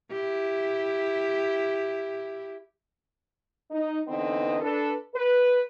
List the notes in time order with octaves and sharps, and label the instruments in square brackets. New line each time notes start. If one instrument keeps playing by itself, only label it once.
[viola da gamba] E4 G4
[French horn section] D#4
D3 E3 B3 C4 D#4 D#5
D4 A4 B4
B4